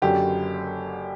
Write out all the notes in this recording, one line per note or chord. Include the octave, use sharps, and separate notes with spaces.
F#1 F#2 D3 F#3 G4